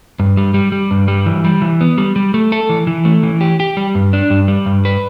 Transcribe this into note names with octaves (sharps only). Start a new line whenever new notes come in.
G2
G3
G3
G3
G2
G3
E3
G3
E3
B3
G3
G3
A3
A4
E3
E3
A3
E3
G4
G4
G3
G2
D4
G2
G3
G2
B4